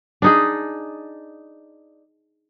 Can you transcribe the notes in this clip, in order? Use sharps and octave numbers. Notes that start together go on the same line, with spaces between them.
D4 D#4 G#4